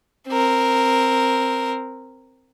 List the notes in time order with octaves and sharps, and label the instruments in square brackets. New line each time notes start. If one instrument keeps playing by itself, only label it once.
[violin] C4 A#4